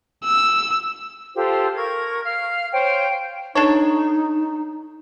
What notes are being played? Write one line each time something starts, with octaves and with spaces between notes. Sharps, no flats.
E6
F4 G4 A4 C5
A#4 C#6 G#6
F5 F6
C5 C#5 F5 G5
D4 D#4 A4 C#5